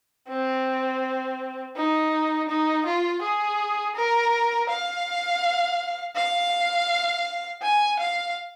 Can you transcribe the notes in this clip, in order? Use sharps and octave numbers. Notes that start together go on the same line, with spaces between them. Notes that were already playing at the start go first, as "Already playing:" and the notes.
C4
D#4
D#4
F4
G#4
A#4
F5
F5
G#5
F5